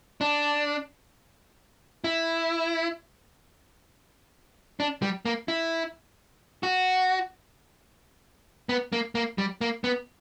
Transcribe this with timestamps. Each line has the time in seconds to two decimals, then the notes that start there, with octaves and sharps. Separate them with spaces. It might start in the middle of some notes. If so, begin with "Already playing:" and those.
0.21 D4
2.04 E4
4.80 D4
5.02 G3
5.25 A#3
5.48 E4
6.63 F#4
8.69 B3
8.93 A#3
9.15 A#3
9.38 G3
9.61 A#3
9.84 B3